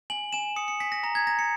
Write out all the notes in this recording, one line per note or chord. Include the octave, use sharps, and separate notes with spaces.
G#5 F#7
G#5 E7
D#6 C#7
C#7
G#5 B6
A#6
A#5 A#6
G#6
A#5 A#6
C#7